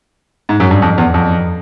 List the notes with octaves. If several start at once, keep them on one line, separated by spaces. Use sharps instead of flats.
G#2
F#2
G2
F2
E2
F2